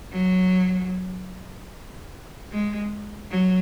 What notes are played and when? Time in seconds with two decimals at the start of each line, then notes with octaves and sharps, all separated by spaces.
0.12 F#3
2.52 G#3
3.31 F#3